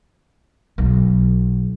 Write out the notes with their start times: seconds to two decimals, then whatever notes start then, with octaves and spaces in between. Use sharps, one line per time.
0.78 B1